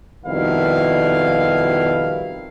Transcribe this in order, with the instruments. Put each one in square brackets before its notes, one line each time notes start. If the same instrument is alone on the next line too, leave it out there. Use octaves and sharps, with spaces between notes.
[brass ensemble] F2 B2 D#3 G3 E4 F5